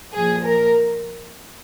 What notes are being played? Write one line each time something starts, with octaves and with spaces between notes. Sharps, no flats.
A#2 F3 G#4
A#4